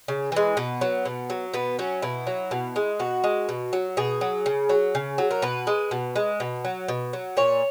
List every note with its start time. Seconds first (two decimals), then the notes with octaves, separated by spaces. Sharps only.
0.08 C#3
0.32 E3 G#3
0.57 B2 B3
0.81 F#3
1.05 B2
1.30 F#3
1.54 B2 B3
1.79 F#3 C#4
2.02 B2 E4
2.27 F#3
2.51 B2
2.76 G#3
2.99 B2 F#4
3.24 G#3
3.49 B2
3.73 F#3
3.97 B2 G#4
4.21 F#3
4.46 C#3
4.69 F#3
4.95 C#3
5.18 F#3
5.31 A#4
5.42 B2 B4
5.67 G#3
5.91 B2
6.16 G#3
6.40 B2
6.65 F#3
6.88 B2
7.13 F#3
7.37 A#2 C#5